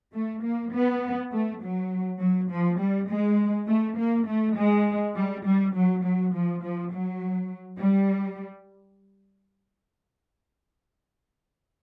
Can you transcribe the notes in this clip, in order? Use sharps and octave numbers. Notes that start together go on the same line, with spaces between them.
A3
A#3
B3
A3
F#3
F#3
F3
G3
G#3
A3
A#3
A3
G#3
G3
G3
F#3
F#3
F3
F3
F#3
G3